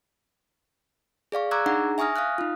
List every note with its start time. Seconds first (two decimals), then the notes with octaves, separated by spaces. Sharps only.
1.32 G#4 D5 F5 C#6
1.51 A#5 C#6 D6 E6 F#6 G#6
1.66 D4 D#4 G#4 F#5 A#5
1.98 E5 G#5 C#6 D#6 F6 A#6
2.16 F5 D#6 F6 F#6
2.38 D#4 F4